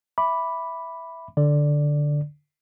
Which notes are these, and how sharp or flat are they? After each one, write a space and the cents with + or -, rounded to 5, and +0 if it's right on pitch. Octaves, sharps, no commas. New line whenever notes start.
E5 +0 B5 +0 D6 +0
D3 +0 D5 +0